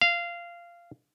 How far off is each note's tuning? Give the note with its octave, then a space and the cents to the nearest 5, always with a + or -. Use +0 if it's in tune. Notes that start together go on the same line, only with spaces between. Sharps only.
F5 -15